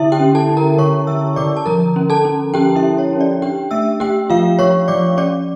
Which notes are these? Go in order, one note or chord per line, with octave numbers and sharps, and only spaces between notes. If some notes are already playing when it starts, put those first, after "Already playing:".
Already playing: D3 E4 E5
G4 G5
C#4
A4 A5
C#4
A#4 A#5
D3 C#5 C#6
D3 E5 E6
D3 D5 D6
A5
F3 A#4 A#5
C#4
A4 A5
C#4
C#4 G4 G5
E4 E5
C#4
C#5
C#4
D5
D4 G4 G5
A3 E5 E6
A3 G4 G5
F3 F4 F5
F3 C#5 C#6
F3 D5 D6
C#4 D5 D6